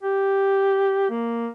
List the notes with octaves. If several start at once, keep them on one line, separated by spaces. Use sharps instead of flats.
G4
A#3